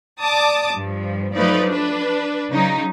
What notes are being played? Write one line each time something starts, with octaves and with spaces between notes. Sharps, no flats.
D5 A5 D6 D#6
G2 F3
F3 F#3 A3 D#4 B4 D5
D4 B4
C#3 F#3 D#4